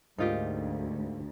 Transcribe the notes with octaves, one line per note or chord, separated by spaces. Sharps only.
D2 G#2 D3 A#3 D#4 F4 G4